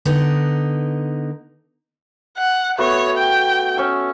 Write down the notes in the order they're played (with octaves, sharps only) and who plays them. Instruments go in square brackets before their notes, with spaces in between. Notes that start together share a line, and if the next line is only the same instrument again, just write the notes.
[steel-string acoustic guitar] D3 B3 D#4
[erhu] F#5
[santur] A3 B3 F#4 [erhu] C#5
[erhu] G5
[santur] C#4 C#6 E6